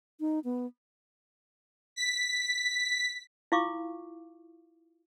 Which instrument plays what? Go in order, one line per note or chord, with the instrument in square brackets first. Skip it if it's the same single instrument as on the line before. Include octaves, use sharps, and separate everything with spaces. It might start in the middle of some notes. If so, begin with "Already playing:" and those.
[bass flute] D#4
B3
[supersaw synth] B6
[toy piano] E4 F4 F5 C#6 D6